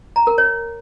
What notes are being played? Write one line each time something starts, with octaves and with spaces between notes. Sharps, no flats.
A#5
A#4
C#5